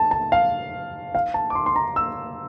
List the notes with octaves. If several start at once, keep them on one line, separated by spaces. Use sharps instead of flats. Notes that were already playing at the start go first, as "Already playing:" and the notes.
Already playing: A5
A5
F5
F5
A5
D6
C6
C6
A#5
E6